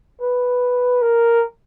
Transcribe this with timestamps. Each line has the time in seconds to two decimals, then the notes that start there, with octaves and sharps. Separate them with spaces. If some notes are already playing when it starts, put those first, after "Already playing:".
0.21 B4
1.02 A#4